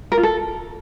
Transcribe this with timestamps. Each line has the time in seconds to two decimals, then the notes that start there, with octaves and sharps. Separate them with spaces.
0.12 A#4
0.17 F4
0.23 A4